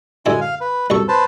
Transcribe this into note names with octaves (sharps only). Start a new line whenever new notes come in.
F#2 D3 G#3 E4 G#5
F5
B4
C2 F#2 A4 C#6
B4 C5 A5